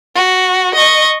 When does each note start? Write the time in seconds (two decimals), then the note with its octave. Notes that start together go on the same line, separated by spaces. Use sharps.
0.15 F#4
0.75 D#5 C#6